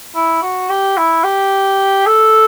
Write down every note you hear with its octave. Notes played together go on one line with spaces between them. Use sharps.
E4
F#4
G4
E4
G4
A4